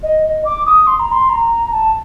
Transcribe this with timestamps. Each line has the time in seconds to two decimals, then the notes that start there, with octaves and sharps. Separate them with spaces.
0.03 D#5
0.24 D#5
0.45 D6
0.66 D#6
0.87 C6
1.00 A#5
1.12 C6
1.29 A#5
1.72 A5